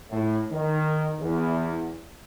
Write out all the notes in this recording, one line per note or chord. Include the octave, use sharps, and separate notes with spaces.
A2
D#3
E2